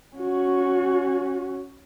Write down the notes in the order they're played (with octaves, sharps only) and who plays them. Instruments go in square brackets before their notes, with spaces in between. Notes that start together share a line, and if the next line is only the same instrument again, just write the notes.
[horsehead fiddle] C#4 F#4